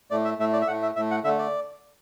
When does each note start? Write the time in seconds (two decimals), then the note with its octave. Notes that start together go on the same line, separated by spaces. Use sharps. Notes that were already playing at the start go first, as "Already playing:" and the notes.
0.11 A2 A3 D5
0.25 E5
0.39 A2 A3 E5
0.53 D5
0.62 E5
0.67 A2 A3 F#5
0.82 E5
0.96 A2 A3 E5
1.11 F#5
1.24 D3 E5
1.27 A3
1.39 D5